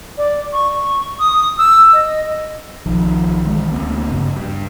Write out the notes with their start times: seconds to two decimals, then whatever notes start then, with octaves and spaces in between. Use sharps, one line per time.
0.18 D5
0.53 C#6
1.20 D#6
1.58 E6
1.93 D#5
2.86 B1 D#3 F3
3.45 D#3 E3 G#3
3.71 D2 G#3 A#3 C4
4.12 G2 C#3 B3
4.36 G2